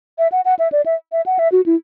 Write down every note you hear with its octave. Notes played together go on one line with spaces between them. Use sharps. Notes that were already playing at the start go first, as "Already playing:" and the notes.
E5
F#5
F#5
E5
D5
E5
E5
F#5
E5
F#4
E4